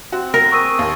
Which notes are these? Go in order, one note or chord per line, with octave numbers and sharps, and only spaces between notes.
C4 F#4
A#4
C4 G#4 C#6 E6 D#7
D#2